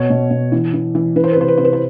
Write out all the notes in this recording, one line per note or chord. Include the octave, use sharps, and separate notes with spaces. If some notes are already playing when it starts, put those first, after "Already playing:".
Already playing: B2 C#5
B2
B2
E3
E3
E3
E3 B4
C5
B4
C3 C5
B4
C3 C5
B4
C5